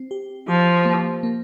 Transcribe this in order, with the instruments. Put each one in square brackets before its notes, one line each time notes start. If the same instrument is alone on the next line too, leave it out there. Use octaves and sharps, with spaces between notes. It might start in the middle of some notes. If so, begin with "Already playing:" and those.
Already playing: [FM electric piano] C4
G4
[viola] F3 [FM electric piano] G4
[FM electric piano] A#3
A#3